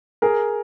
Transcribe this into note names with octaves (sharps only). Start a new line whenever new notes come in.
G#4 A#4